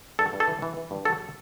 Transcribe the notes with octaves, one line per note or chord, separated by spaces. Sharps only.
G2 A4
G2
A4
E3
E3
E3
G2
F#3 A4